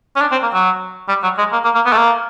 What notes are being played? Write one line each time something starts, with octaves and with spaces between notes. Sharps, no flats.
C#4
D4
C4
A#3
F#3
G3
F#3
G#3
A#3
A#3
A#3
B3
A3
A#3